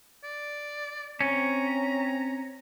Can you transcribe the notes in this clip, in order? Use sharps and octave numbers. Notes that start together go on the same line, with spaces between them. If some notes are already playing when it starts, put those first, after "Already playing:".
D5
C4 C#4 A#5